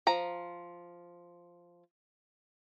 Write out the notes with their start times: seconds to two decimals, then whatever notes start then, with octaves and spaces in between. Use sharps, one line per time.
0.07 F3 A#5